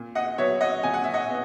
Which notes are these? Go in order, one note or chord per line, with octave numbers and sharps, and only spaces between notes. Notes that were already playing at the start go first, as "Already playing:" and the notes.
Already playing: A#2
D#5 F#5
F#3 B3 C#5 E5
D#5 F#5
A#2 G#5
F#5
E5
D#5 F#5
B3